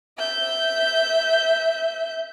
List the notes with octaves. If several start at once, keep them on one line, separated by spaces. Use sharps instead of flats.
E5 G6